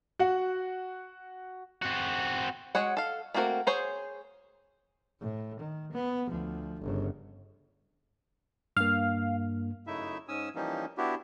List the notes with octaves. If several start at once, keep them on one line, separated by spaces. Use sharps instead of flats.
F#4 F#5
C4 F#4
G#3 F#4 C#5 F#5
A4 F5
A3 A#3 C4 F#4 A#4
G#4 C5 C#5
A2
D#3
B3
D2 F3
G1 C#3
G2 A#3 F5
F#2 C#3 A3 D#4 E4 E5
G#2 C#4 G#5 D#6 E6
E3 F3 G3 A#3 C#4 D#4
B3 D4 E4 F#4 G4